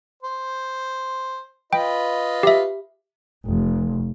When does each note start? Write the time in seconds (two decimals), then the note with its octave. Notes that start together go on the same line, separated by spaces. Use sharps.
0.23 C5
1.73 F4 B4 D#5 G5
2.43 G4 E5
3.48 F1